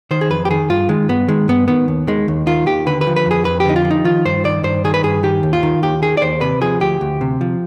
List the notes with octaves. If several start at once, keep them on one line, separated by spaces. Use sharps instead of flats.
D#3 C5
G#4
F2 B4
G4
D#3 G#4
G2 F4
D#3 G#3
G2 B3
D#3 G#3
G2 B3
D#3 B3
D#2
D#3 G#3
D#2
D#3 F4
D#2 G4
D3 B4
B4
F3
B4
F2 G#4
F2 B4
G4
D3 D#4
F4
F3
D#4
D#3 F4
G2 C5
D#3 D5
G2 C5
D#3 G#4
B4
G2 G#4
D#3 G4
D#2
F4
D#3
D#2 G4
D#3 G#4
D5
D#2 C5
C3 B4
F3 G#4
D2 G4
D2
C3
F3